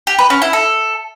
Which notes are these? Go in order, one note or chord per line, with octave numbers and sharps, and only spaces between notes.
G4
B4
C#4
E4
A4